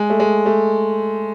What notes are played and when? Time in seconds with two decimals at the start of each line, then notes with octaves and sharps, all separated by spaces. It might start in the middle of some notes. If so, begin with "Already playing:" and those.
Already playing: G#3
0.10 A3
0.20 G#3
0.46 A3